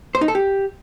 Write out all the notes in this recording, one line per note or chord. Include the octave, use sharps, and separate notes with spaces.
C5
D#4
A4
G4